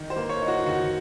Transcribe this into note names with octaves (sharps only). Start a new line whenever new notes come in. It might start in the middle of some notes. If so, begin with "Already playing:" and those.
Already playing: D#3
C5
A#3
C#5
D#4
F#4
D#3 F#4